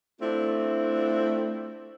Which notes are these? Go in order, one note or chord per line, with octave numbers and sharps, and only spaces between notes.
A3 C4 D4 E4 F4